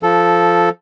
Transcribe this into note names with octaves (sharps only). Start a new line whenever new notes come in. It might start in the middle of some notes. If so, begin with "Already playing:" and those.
F3 A4